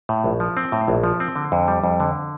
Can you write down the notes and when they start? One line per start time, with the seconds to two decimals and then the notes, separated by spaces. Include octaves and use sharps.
0.09 A2
0.24 A#1
0.40 F3
0.57 C4
0.72 A2
0.88 A#1
1.04 F3
1.20 C4
1.36 D3
1.52 F2
1.68 G3
1.84 F2
2.00 D3